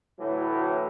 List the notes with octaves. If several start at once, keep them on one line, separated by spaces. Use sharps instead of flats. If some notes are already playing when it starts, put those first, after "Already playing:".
D2 A2 E3 F#3